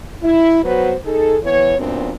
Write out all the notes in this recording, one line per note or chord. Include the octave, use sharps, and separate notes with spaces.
E4
F#3 B3 F#4 B4 C5
D#4 G#4 A4
E3 B3 C#5
F#2 A#2 B3 C4 D4